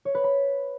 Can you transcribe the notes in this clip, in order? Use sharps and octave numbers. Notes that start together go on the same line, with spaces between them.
C#5
B4
B5